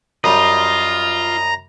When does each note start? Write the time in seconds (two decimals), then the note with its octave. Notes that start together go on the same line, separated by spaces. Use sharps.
0.24 F#2 G3 F4 D#5 A#5